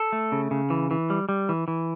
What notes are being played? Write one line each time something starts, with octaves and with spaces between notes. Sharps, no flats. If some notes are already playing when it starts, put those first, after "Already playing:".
Already playing: A4
A3
C#3
C#3
E3
E3
G3
G3
E3
E3